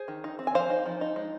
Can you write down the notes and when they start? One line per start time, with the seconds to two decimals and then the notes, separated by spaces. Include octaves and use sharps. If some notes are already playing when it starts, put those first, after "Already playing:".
Already playing: G#4 C5
0.08 D#3
0.24 D#4
0.39 C4
0.47 G#5
0.54 F3 C5 F5
0.70 D#4
0.86 F3
1.01 D#4
1.16 G#3